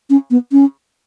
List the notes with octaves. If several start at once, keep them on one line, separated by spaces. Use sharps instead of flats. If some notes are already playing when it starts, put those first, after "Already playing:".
C#4
B3
C#4